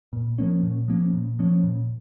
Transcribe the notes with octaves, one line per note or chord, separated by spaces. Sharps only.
A#2
F3 A#3 C#4
A#2
F3 A#3 C#4
A#2
F3 A#3 C#4
A#2